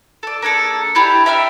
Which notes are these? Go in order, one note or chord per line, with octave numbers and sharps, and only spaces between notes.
A4 D5
A#3 D4 G#4 A4
D4 E4 G4 A#5
E5 G5 E6 F6